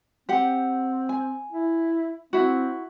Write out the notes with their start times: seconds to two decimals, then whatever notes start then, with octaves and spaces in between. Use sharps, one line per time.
0.29 C4 G4 F#5
1.09 G#5
1.52 E4
2.33 C4 E4 F#4